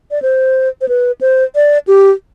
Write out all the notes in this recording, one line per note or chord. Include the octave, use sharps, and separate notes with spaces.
D5
C5
C5
B4
C5
D5
G4